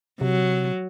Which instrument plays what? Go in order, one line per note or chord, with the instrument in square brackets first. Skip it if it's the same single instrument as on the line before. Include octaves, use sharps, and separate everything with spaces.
[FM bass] C3 [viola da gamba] F#3